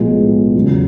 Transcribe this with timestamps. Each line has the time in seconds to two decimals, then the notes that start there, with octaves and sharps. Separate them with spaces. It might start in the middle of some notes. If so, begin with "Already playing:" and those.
Already playing: B1 A2 F3 G#3 B3
0.55 E1 E2 C#3 F#3